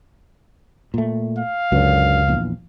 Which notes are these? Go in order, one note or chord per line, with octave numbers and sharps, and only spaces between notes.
A#2 A3
F5
C#2 F#2 D3
A#1 E2